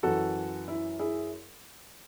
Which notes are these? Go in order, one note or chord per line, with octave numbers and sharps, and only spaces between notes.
F#2 E3 F#4 A4
E4
E4 G#4